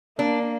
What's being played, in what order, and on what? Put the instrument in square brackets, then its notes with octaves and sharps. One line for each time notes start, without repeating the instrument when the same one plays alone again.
[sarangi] A#3 [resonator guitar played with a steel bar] D4